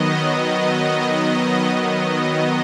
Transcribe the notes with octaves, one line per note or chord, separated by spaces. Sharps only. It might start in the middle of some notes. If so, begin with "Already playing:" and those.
Already playing: D#3 F#3 B3 D#5
D#5
D#5